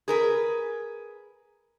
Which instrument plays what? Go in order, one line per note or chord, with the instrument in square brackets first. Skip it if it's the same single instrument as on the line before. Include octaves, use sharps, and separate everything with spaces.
[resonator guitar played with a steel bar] G#4 A#4 B4